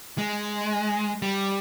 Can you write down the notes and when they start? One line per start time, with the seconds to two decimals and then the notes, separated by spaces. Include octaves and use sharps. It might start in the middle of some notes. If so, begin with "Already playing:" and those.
0.18 G#3
1.22 G3